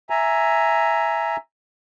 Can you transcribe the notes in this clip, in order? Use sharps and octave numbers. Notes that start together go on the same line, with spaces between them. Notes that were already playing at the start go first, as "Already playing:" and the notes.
E5 G#5 A#5